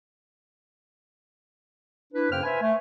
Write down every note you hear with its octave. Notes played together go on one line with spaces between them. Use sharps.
D4 E4 B4
F#2 C#3 A#3 C5 G5 F6
B4 C5 E5 G#5
A3